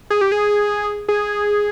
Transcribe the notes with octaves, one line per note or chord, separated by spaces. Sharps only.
G#4
G4
G#4
G#4